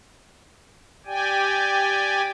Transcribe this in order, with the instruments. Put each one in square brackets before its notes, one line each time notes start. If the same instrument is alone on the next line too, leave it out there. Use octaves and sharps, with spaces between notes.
[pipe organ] G4 D5 G5 G#5